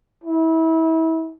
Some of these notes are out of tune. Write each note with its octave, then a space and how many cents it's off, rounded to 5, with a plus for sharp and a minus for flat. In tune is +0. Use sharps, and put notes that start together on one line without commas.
E4 -30